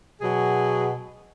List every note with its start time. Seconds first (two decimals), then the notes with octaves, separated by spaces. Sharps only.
0.21 B2 F#3 G#4